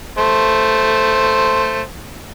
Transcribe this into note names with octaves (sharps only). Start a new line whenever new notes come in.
A3 C5